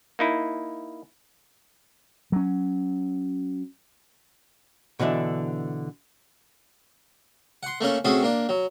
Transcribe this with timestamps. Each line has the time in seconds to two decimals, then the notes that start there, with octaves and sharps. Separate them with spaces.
0.19 A#3 D#4 E4
2.32 F#3 C#4
4.99 B2 D3 E3 D4 E5
7.63 F#5 C6
7.81 A3 A#3 C#4 A4
8.05 A3 C4 C#4 F#4 G#4
8.23 A#3 D4
8.49 F#3